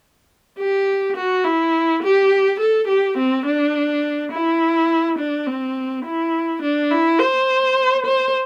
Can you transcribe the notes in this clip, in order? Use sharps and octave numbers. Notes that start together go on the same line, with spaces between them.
G4
F#4
E4
G4
A4
G4
C4
D4
E4
D4
C4
E4
D4
E4
C5
C5